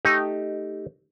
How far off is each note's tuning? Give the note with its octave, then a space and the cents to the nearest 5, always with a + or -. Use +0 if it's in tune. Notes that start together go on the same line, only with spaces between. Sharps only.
A3 +0 D#4 +0 G4 +0